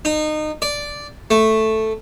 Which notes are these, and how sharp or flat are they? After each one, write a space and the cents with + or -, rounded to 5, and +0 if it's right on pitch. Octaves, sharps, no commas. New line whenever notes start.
D#4 -25
D5 -5
A3 +0